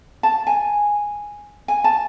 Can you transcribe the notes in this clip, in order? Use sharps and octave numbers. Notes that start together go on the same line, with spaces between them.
A5
G#5
G#5
A5